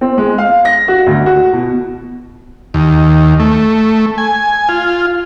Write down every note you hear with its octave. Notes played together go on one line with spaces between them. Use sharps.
C4
G#3
F5
A#6
F#4
D2
F#4
B2
D#2
A3
G#5
F4